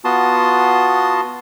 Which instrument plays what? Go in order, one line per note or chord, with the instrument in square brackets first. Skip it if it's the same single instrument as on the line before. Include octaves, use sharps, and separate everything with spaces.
[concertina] B3 F4 F#4 A5 C6 D#6